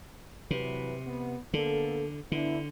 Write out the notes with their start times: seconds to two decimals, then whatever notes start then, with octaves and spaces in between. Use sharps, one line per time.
0.51 C3 E3 F#3 B4
1.07 B3
1.54 D3 A#3 B3 A4
2.32 D3 B3 D4 E4